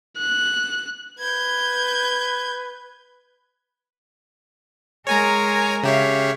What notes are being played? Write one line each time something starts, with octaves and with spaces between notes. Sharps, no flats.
F#6
B4 G6 G#6
G#3 A#4 C#5 G#5 A#5
C#3 G4 C#5 E5 F5